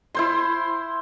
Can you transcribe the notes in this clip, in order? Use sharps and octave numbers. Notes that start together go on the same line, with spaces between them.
E4 C5 C6